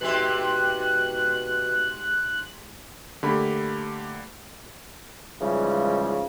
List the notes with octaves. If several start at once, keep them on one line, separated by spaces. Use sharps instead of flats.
G#2 B2 C4 G4 F#6
D3 A3 A#3 G4 B5
G#2 C#3 E3 F3 G3 G#3